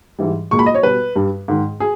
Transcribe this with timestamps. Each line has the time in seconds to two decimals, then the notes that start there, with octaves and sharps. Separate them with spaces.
0.19 G#2 E3 G3
0.51 A#2 G#3 C#6
0.59 B5
0.66 D#5
0.75 C#5
0.83 B2 G3 B4
1.16 G2 G3
1.48 G#2 D#3 G#3
1.80 G#4